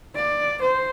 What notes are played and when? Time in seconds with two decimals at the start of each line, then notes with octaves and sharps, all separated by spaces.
0.15 D5
0.61 C5